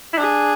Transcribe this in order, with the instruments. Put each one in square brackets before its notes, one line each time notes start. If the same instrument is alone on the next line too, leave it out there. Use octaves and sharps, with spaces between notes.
[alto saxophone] E4
[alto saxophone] D4 [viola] G#4